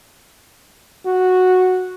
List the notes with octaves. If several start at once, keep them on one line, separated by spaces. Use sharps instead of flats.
F#4